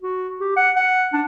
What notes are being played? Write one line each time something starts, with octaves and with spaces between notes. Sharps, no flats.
F#4
G4
F#5
F#5
D4